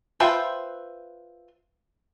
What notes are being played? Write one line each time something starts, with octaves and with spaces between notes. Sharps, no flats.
F4 B4 C5 E5 G5